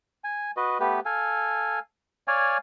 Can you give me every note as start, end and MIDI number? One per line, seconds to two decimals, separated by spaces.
0.24 0.51 80
0.57 0.78 66
0.57 0.78 71
0.57 0.78 75
0.80 1.00 57
0.80 1.00 59
0.80 1.00 67
0.80 1.00 71
1.05 1.79 69
1.05 1.79 77
1.05 1.79 80
2.28 2.58 73
2.28 2.58 74
2.28 2.58 77
2.28 2.58 80